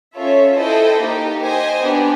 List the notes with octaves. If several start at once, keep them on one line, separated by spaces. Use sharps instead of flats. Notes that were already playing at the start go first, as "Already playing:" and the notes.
C#4 F4 A4 C#5 E5
E4 A4 C5 D#5 G5
A#3 D#4 G4
G4 C5 D#5 G#5
B3 D4 G4